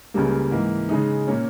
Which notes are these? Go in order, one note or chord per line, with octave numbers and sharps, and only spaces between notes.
C#2 C#3 G3 A#3
G#2 E3 A#3
C#3 G#3 D#4
A#2 A#3 C#4